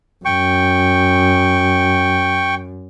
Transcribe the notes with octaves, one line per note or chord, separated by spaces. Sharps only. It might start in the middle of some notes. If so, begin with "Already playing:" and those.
F#2 G5 C#6